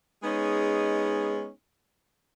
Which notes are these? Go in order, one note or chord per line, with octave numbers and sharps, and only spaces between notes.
G#3 B3 C#4 D#4 G#4